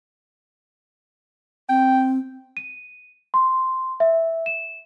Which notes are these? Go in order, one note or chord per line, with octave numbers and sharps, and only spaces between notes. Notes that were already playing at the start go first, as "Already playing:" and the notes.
C4 G5
D#7
C6
E5
E7